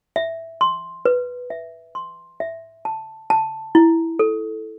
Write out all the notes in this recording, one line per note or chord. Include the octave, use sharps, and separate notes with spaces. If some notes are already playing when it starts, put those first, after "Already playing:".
E5
C6
B4
E5
C6
E5
A5
A5
E4
A4